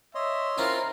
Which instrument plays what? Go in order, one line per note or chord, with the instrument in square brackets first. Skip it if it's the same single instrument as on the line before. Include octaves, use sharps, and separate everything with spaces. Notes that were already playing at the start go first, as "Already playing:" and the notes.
[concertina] C#5 D#5 C6 [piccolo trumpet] E5
[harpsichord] C4 C#4 [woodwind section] E4 A#4 [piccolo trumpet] F4